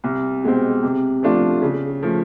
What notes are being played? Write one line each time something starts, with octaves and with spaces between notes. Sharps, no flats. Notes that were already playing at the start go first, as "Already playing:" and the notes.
C2
B2 G#3 C4
C3
F3 A3 D4 F4
C#3
F3 A3